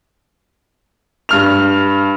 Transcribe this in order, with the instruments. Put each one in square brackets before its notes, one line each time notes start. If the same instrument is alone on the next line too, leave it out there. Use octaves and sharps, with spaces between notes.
[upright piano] G2 F6 F7